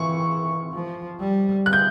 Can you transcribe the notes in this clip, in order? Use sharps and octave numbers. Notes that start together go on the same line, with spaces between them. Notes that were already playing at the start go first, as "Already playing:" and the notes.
Already playing: E3 C#6
F3
G3
F#6
G6